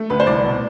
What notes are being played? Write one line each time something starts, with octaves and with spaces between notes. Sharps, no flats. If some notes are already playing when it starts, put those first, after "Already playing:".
Already playing: A3
D2 B4
C5
C2 D5
B2